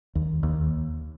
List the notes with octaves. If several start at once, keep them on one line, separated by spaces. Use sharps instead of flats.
D#2
D#2